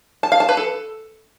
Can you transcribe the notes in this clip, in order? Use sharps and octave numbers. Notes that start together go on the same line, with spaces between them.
A5
F5
A5
B4
A4